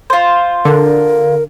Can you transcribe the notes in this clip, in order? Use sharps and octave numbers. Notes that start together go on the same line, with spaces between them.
F4 C5
D3 A#4